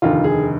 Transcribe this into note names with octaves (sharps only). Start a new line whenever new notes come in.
F1 D#2 D3 F4
G#4